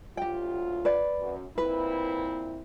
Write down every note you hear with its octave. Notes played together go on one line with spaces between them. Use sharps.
D2 F#3 F4 G4 G5
B4 D5
F#2
A#2 C4 E4 B4